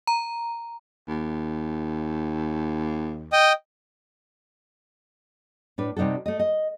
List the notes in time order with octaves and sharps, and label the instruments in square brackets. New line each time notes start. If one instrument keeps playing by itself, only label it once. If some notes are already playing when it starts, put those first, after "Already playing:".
[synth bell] A#5
[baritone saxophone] D#2
[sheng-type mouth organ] D#5 G5 D#6
[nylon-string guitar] A2 D4 B4
C3 G3 D#4 F#4 A4
A3 D#5
D#5